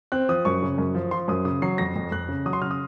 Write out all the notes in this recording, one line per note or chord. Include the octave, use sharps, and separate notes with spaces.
C4 F#6
F3 D#6
F#2 C#6
C#3
F#2
F3
F3 C6
F#2 D#6
C#3 D#6
F#3 C7
F2 A#6
F2
F2 F#6
C#3
F#3 D#6
C6
C#3 F6
D#6